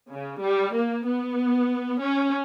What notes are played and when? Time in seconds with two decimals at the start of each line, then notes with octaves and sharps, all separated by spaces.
0.11 C#3
0.42 G3
0.74 A#3
1.06 B3
2.00 C#4